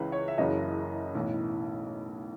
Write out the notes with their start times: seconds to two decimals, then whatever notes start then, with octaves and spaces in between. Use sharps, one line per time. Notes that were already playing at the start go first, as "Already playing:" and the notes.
Already playing: C#2 C#3 E3 B4
0.12 C#5
0.28 E5
0.38 F#1 F#2 C#3 E3 D#5
1.15 B1 A2 E3